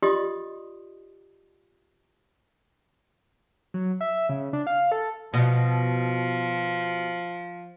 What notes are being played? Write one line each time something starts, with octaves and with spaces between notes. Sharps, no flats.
F4 G4 D5 D#5 C6 D#6
F#3
E5
C#3
D4
F5
A4
B2 F3